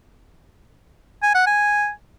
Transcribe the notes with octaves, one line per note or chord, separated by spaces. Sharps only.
G#5
F#5
G#5